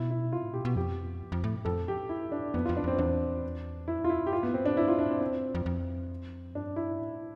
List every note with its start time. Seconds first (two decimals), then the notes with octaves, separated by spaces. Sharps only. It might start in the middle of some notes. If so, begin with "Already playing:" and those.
Already playing: B2 E4
0.10 E4
0.32 C3 F4
0.43 A2
0.54 B2 G4
0.65 B2
0.76 F2 G4
1.32 F2
1.44 A2
1.65 F2 A4
1.88 G4
2.09 E4
2.32 D4
2.54 F2 B3
2.65 F2 F4
2.77 D4
2.84 F2 C4
2.98 E2 D4
3.88 F2 E4
4.04 F4
4.09 E4
4.27 G4
4.32 G2 F4
4.43 B3
4.54 C4
4.66 D4
4.77 E4
4.88 F4
4.99 D4
5.10 C4
5.21 F2 C4
5.32 E2
5.43 F2
5.55 F2
5.66 F2
6.55 G2 D4
6.76 E4
6.99 A2